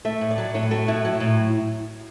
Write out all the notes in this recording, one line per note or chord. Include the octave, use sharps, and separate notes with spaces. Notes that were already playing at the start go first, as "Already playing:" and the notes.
A3 E5
A2
D5
F#3
A2 C#5
A3 F#4
A2 E4
F#3
A2